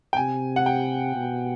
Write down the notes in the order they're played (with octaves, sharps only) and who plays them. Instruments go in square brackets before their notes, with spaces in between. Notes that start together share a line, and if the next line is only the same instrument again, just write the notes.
[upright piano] G5
[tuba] C3 [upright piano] G#5
[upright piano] F#5
G5
[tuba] B2